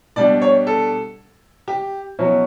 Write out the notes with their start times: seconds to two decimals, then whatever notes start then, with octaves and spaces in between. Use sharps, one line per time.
0.16 B2 G3 D4 D5
0.42 C#5
0.67 A4
1.68 G4
2.19 B2 F#3 C#4 E4